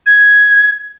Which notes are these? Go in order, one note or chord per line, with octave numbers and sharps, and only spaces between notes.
G#6